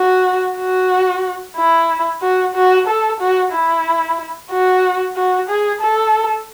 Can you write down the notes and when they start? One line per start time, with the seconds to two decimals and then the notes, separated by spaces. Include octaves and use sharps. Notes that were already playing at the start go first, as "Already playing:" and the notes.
Already playing: F#4
0.58 F#4
1.57 E4
2.22 F#4
2.55 F#4
2.87 A4
3.20 F#4
3.52 E4
4.51 F#4
5.16 F#4
5.49 G#4
5.81 A4